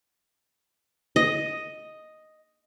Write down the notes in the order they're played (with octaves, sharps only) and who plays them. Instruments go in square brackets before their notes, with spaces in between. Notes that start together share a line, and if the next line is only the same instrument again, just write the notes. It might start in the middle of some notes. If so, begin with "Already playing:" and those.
[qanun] D#5